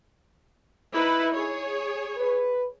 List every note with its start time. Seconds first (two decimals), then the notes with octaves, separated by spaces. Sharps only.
0.93 D#4 E4 B4
1.35 G#4 C#5
2.17 B4